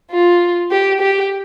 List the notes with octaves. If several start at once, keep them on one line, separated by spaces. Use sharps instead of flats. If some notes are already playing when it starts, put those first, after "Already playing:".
F4
G4
G4